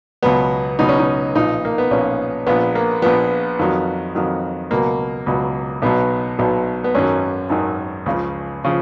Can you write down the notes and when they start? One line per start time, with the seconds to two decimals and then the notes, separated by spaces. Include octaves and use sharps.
0.23 C#2 B2 F#3 B3
0.79 C#2 B2 F#3 D#4
0.89 C#4
0.99 D#4
1.35 B1 A#2 F3 D#4
1.65 A#3
1.78 B3
1.91 B1 A#2 F3 C#4
2.47 A#1 A#2 F3 B3
2.75 A#3
3.02 A#1 A#2 F3 B3
3.59 F2 D#3 F#3
4.15 F2 D#3 F#3
4.71 C#2 B2 F#3 A#3
5.26 C#2 B2 F#3
5.82 B1 B2 F#3 B3
6.39 B1 B2 F#3
6.84 B3
6.94 G#1 F#2 D#3 F#3 C#4
7.49 G#1 F#2 D#3 F#3
8.06 C#2 C#3 F3
8.64 C#3 F3